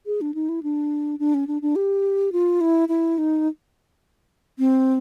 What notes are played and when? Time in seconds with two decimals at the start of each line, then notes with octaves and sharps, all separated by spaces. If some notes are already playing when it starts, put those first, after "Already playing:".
0.06 G#4
0.21 D4
0.34 D#4
0.49 E4
0.63 D4
1.19 D4
1.34 C#4
1.47 D4
1.62 D4
1.76 G4
2.32 F4
2.61 E4
2.89 E4
3.18 D#4
4.59 C4